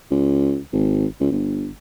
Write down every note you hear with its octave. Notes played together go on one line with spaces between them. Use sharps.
C#2
G#1
C#2
G1